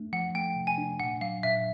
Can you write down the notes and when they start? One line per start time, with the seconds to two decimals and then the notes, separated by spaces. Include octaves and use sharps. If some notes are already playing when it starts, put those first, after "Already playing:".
Already playing: A3 D4
0.13 F3 F#5
0.35 A3 G5
0.56 C3
0.67 G#5
0.78 D4
1.00 A#2 F#5
1.21 F#3 F5
1.43 A#2 E5